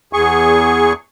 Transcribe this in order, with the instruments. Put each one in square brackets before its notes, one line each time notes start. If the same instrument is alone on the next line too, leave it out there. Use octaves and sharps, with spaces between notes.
[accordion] E2 G#4 C#6